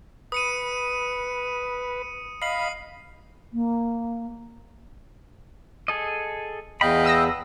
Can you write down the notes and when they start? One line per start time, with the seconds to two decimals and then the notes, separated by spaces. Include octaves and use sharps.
0.32 B4 D#6 C#7 D#7
2.42 D#5 F5 B5 C7 F#7
3.53 A#3
5.88 G#4 A4 D#5
6.81 E2 B4 D#5 F5 G5 B5
7.04 D#6 E6 A#6